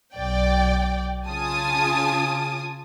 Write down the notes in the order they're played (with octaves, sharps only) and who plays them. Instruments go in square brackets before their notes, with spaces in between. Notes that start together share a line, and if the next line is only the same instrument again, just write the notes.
[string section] B1 D5 G5
C#3 F4 G#5 A5 D#6